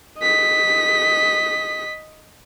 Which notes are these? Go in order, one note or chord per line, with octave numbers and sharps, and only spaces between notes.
D#5 B6